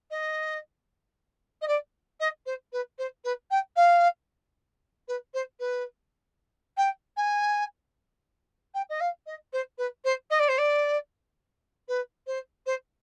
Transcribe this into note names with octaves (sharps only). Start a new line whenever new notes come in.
D#5
D#5
D5
D#5
C5
B4
C5
B4
G5
F5
B4
C5
B4
G5
G#5
G5
D#5
F5
D#5
C5
B4
C5
D#5
D5
C5
D5
B4
C5
C5